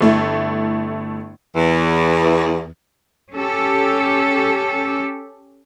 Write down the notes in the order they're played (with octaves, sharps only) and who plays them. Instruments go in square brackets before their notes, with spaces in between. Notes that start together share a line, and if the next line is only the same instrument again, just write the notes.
[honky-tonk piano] G1 A3 E4
[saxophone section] E2 E3
[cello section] C#4 G4 A4